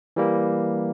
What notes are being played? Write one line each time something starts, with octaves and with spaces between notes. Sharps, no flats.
E3 G3 A#3